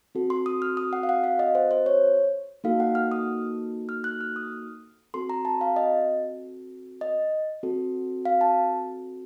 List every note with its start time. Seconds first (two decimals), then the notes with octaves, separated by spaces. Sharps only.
0.15 C4 F#4 A4
0.30 C6
0.46 D#6
0.62 F6
0.77 D#6
0.93 F#5
1.03 F5
1.09 F#5
1.24 F5
1.39 D#5
1.55 C5
1.71 C5
1.86 C#5
2.64 A#3 D#4 F#4 A4 F5
2.80 F#5
2.95 F6
3.12 D#6
3.89 F6
4.04 F#6
4.21 F6
4.36 D#6
5.14 C4 F#4 A4 C6
5.30 A#5
5.45 A5
5.61 F5
5.76 D#5
7.01 D#5
7.63 C4 F#4 A4
8.25 F5
8.41 A5